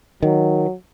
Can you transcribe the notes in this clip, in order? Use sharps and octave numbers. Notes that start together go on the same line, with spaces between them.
D#3 F#3